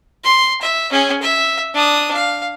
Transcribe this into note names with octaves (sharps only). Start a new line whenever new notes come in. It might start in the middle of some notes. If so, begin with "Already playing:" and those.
C6
E5
C#4 G#4
E5
D4 D#6
F5